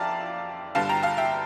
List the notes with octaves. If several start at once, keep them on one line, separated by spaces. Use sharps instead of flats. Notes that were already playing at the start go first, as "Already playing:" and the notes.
Already playing: G1 F2 D5 E5 F5 G5 A5 A#5
G1 G2 D3 G3 F5 A5
G5 A#5
F5 A5
E5 G5